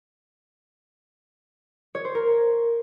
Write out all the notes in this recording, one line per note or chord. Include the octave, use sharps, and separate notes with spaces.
C#5
C5
A#4